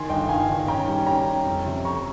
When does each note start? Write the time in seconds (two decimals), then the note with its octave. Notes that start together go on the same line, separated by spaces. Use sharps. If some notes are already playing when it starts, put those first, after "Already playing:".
Already playing: D#3 G#5 C6
0.09 G1 D#5 G5
0.29 G2 F5 G#5
0.49 D#3
0.68 C#4 G5 A#5
0.88 G3
1.07 C#4 G5 A#5
1.26 C#4
1.46 F2
1.66 C3
1.85 F2 A#5 C#6